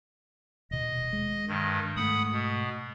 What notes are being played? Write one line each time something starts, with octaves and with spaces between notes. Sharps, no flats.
D#1 B2 D#5
G#3
G2 D#3
G#2 A3 F#5 B5 D#6
B2